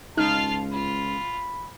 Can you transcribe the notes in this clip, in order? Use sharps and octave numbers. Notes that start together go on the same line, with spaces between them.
C#2 D#4 F4 F5 A5 F6
F4 B5